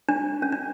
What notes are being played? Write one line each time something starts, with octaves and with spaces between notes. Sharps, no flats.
D4
C#4
D4